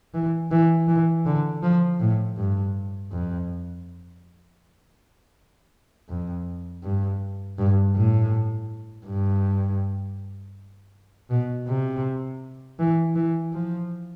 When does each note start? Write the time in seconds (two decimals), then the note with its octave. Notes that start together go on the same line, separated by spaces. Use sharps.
0.14 E3
0.51 E3
0.88 E3
1.26 D3
1.62 F3
2.00 A2
2.36 G2
3.12 F2
6.09 F2
6.83 G2
7.58 G2
7.96 A2
9.06 G2
11.30 B2
11.68 C3
12.79 E3
13.15 E3
13.53 F3